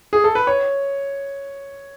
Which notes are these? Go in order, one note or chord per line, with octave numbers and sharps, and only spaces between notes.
G#4
A4
B4
C#5